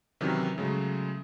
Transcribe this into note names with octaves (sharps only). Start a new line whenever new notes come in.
C3 D#3 E3 F#3 C#4
C#3 F#3 G#3 A3